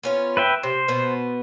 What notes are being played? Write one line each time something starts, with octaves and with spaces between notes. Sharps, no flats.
B3 C#4 F4
B4 E5 G5
C3 C5
B2 B3